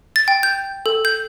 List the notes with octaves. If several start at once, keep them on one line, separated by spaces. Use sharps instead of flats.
A6
G5
G6
A4
G6